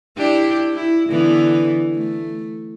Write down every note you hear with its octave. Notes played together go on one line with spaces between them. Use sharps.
D4 E4 G4
E4
D3 E3 B3
A3